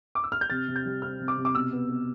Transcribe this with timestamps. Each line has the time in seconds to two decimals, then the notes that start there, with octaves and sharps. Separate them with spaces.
0.15 D6
0.24 E6
0.32 F6
0.41 G6
0.50 C3 A6
0.68 C3
0.76 G6
0.86 G3
1.02 C4 F6
1.20 C3
1.28 D6
1.37 C3
1.45 D6
1.54 B2 E6
1.73 B3
1.89 B3